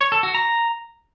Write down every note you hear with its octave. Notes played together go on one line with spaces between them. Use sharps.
C#5
A4
F#4
A#5